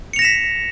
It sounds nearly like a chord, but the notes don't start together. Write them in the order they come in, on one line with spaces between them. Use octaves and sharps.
C#7 F7 A#6 E7 B6